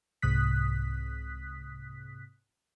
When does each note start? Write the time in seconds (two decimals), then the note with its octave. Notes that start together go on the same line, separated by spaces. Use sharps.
0.22 C2 G#2 C3 D#6 F#6 B6